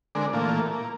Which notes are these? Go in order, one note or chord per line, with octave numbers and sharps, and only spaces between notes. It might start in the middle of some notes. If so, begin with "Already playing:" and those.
D3 G#3 C4 D4 A#4
A#2 E3 A3 A#3 F4
A#3